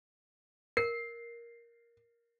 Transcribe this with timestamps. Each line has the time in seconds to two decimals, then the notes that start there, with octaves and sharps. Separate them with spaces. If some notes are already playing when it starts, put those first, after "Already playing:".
0.77 A#4 C7